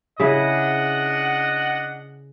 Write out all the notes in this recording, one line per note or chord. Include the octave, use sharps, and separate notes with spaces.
C#3 D4 E4 G#4 D#5 F#5